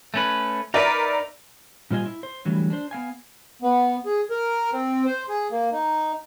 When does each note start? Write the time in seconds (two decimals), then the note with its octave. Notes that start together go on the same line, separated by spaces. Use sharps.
0.14 A3 C#4 B4
0.74 D#4 A#4 B4 D5 E5
1.90 A#2 G3 F4 C5 D#5 G#5
2.06 E4
2.23 C5
2.45 D3 E3 F#3 G3 A3
2.70 D4 C5
2.91 B3 F5 G#5
3.62 B3
4.06 G#4
4.30 A#4
4.73 C4
5.06 C5
5.29 G#4
5.51 A#3
5.72 D#4